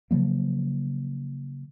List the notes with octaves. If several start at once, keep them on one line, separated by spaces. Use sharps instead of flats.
C#3 F3 F#3 A#3